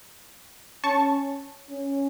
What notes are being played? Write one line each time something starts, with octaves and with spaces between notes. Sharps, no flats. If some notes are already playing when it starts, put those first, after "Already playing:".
C#4 A5 C#6
C#4